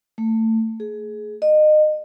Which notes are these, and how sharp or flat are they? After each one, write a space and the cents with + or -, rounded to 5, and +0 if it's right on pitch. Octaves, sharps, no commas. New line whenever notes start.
A3 +25
G#4 +20
D#5 -30